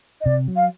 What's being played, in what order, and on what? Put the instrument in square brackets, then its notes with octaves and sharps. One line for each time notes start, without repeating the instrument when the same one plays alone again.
[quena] D#5
[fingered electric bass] C3 [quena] D5
[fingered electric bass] F#3
[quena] F5